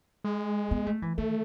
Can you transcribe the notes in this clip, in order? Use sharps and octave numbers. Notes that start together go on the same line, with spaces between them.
G#3
B3
A3
E3
D#3 A3